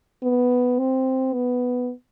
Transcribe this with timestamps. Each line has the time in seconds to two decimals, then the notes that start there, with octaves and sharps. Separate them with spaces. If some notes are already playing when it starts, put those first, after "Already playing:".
0.23 B3
0.79 C4
1.33 B3